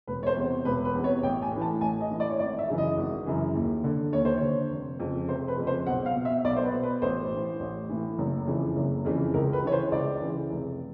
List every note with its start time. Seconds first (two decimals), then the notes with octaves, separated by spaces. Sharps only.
0.07 E1 B4
0.23 C#5
0.27 C5
0.37 E2 C3
0.65 E1 B4
0.85 B4
0.94 E2 C3
1.04 C#5
1.23 A1 G5
1.42 G#5
1.52 A2 E3
1.61 A5
1.81 A1 G#5
2.01 D#5
2.10 A2 E3
2.20 D5
2.30 C#5
2.39 G#1 D5
2.59 E5
2.68 F#2 C#3 E3
2.78 D#5
2.97 G#1
3.26 F#2 C#3 E3
3.55 D#2
3.84 D3
4.13 D#2 C#5
4.25 C5
4.37 D3 C#5
4.71 F1
5.00 F2 C#3
5.28 F1 C5
5.48 B4
5.58 F2 C#3
5.67 C5
5.86 B1 F#5
6.06 F5
6.15 B2
6.25 E5
6.44 B1 D5
6.56 C5
6.64 B4
6.73 B2
6.83 B4
7.02 A1 C5
7.31 A2 E3
7.60 A1
7.90 A2 E3
8.18 F#1
8.47 F2 C#3 E3
8.76 F#1
9.05 F2 C#3 E3
9.34 C#2 A#4
9.53 B4
9.63 C#3 E3 C#5
9.72 C5
9.92 C#2 D5
10.21 C#3 E3
10.50 F1